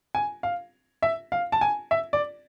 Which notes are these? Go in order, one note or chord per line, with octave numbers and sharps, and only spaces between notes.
G#5
F5
E5
F5
A5
G#5
E5
D5